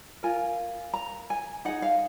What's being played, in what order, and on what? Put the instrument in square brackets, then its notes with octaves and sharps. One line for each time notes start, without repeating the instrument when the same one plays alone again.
[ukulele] F4 A#4 G#5
A#5
G#5
D#4 G#4 F#5
F5